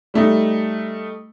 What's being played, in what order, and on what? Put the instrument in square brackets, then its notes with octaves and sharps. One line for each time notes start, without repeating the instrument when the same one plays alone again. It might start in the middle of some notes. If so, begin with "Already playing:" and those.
[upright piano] G3 A3 D#4